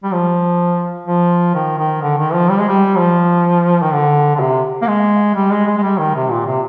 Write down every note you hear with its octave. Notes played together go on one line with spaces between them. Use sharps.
G3
F3
F3
D#3
D#3
D3
D#3
F3
G3
G#3
G3
F3
D#3
D3
D3
C3
A#3
G#3
G3
G#3
G#3
G#3
G3
D#3
C3
A#2
C3